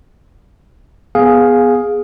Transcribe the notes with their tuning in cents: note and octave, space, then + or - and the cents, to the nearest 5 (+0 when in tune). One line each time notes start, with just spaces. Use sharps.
B3 +0 G#4 +0 F5 +15